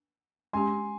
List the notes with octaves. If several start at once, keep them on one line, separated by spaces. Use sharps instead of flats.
G#3 C#4 G4 G#5 C6